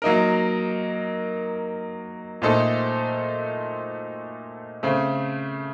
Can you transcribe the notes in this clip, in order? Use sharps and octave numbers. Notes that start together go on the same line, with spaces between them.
F#3 A#3 D#4 A#4
A#2 A3 D#4 A4 C5
C#3 A3 C4